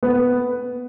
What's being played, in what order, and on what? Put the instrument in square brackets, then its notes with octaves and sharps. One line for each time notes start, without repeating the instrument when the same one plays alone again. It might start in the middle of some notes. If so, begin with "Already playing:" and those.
[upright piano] B3